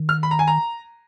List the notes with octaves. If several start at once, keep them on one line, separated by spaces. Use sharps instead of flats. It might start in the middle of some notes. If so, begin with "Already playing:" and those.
Already playing: D#3
F6
B5
A#5
G#5
A#5